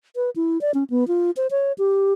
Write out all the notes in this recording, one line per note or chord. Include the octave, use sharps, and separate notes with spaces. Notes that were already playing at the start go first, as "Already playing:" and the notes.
B4
E4
D5
C#4
B3
F4
C5
C#5
G4